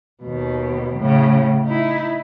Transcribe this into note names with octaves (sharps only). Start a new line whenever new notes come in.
D#2 B2
A2 C#3
D#4 E4